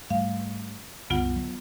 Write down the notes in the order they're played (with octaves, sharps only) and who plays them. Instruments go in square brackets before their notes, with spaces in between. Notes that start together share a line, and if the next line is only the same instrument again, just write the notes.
[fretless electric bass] G#2 G3 A3 [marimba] F5
[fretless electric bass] C2 F#2 D3 [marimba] B3 F4 F#5
[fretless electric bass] F#3